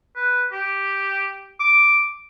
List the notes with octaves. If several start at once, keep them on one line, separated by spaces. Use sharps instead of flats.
B4
G4
D6